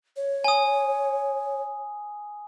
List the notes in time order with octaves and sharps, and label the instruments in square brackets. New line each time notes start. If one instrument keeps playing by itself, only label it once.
[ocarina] C#5
[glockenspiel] G#5 D#6